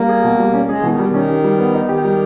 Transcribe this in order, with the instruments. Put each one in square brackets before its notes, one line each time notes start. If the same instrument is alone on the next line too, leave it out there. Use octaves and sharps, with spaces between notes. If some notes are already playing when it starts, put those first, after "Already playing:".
Already playing: [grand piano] G3 [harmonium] A#3
[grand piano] G#4
B2
G3
C#4
[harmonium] G#3 [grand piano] G#4
[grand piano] B2 [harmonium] E3
[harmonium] D#3
[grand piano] G3
[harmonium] D#3
[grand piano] C#4
G4
G3
B3
D#4
[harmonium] D#3 [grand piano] G4
[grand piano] G3